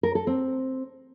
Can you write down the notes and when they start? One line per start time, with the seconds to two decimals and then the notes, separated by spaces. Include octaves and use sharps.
0.03 A#4
0.15 A4
0.27 C4